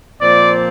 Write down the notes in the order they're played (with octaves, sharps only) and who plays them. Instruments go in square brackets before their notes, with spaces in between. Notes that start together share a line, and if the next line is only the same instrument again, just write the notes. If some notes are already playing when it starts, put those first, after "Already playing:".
[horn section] A#2 F3 C4 D5